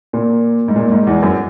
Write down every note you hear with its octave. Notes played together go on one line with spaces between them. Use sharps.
A#2
G#2
A#2
G#2
E2
F#2